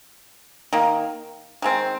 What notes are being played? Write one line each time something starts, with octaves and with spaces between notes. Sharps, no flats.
D#3 A#3
D#3 G#3 C4